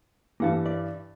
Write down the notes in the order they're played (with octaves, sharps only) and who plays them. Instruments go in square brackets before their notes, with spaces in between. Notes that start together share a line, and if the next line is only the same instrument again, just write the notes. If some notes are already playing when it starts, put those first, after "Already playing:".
[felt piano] G2 E3 [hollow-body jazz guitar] A#3 F#5 A5
[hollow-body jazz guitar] D5 E5